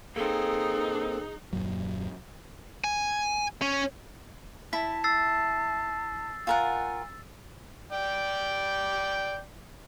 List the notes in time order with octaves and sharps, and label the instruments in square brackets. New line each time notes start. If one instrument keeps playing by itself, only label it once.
[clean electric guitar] A#3 C4 [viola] D#4 [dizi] G#4 [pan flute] A4
[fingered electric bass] D#1 F#2 A#2 F#3
[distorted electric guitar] G#5
C#4
[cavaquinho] E4 [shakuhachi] A5 [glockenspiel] B6
[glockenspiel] E6 A6 C7
[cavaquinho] F4 A#4 F#5 [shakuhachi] G#5
[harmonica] D5 G5